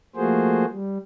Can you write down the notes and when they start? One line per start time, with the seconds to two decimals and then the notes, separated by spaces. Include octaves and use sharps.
0.16 F3 A3 A#3 F#4 G#4 C5
0.70 G3